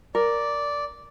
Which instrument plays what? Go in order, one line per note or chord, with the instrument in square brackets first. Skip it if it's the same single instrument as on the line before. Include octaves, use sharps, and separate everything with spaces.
[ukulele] A#4 [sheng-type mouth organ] D5